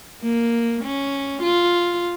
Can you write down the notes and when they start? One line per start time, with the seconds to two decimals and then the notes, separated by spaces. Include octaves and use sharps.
0.22 A#3
0.84 C#4
1.43 F4